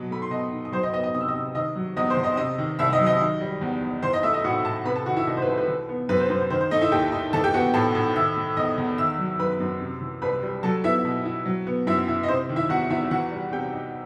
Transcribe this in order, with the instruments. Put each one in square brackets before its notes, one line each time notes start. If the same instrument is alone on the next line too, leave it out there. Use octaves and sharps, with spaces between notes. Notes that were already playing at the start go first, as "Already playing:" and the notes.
Already playing: [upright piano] B2 F#3
A3 B5
C6
B2 D#5 D#6
D#4
D#6
F#3 C5 C6
D#5 D#6
B3 D#5 D#6
D#5 D#6
C3 D#6
E6
D#5 D#6
C3
D#3 D#5 D#6
F#3
E2 D#5 D#6
C5 C6
E2
D#5 D#6
C3 D#5 D#6
D#3
C2 E5 E6
D#5 D#6
F#3
D#5 D#6
D#3
G3
E2
E2
E3 C5 C6
D#5 D#6
A3 E5 E6
D#5 D#6
A2 F#4 F#5
A2 A4 A5
C3 B4 B5
A4 A5
D#3 F#4 F#5
E4 E5
C2 D#4 D#5
C5
B4
C2 C5
B4
E3
B3
F#2 B4
C5
F#2 C5
C5
D#3 C5
C5
A3 D#4 D#5
E4 E5
D#2 G4 G5
D#4
E3 A4 A5
G4 G5
B3 F#4 F#5
A2 A4 A5
A2
D#3 E5 E6
A3
E2 D#5 D#6
E2
D#3 E5 E6
F#3
F#2 B4 B5
F#2
C3
E3
C2 B4 B5
G3
F#3 A4 A5
B3 E4 E5
B2
E4
F#3
B3
F#2 E4 E5
E4
D#5
C3 C5
D#3
E4 E5
E2 F#4 F#5
E2 E4 E5
E3 F#4 F#5
G3
C3 G4 G5
D#4